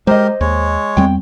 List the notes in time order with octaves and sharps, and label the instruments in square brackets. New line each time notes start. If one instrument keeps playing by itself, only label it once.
[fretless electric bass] G#3 [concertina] G4 A#4 [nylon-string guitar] C5 D#5
[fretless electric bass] D#2 [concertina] G#3 C#5
[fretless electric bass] E2 G3 C4 [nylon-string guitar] G5